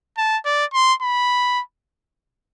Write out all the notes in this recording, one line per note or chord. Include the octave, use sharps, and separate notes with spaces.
A5
D5
C6
B5